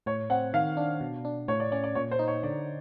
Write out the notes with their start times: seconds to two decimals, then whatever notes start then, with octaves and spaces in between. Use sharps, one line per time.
0.06 A2 C#5
0.30 C4 F#5
0.53 D#3 F5
0.77 D4
1.01 B2
1.25 D4
1.48 A2 C#5
1.60 D5
1.72 C#4 D5
1.84 D5
1.95 A#2 C#5
2.11 C5
2.19 D#4
2.28 C#5
2.43 D3 D5